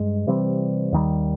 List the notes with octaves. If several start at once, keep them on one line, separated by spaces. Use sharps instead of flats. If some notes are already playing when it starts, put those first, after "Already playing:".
Already playing: G2 G#3
C3 E3 G3 C4
D#2 D#3 G3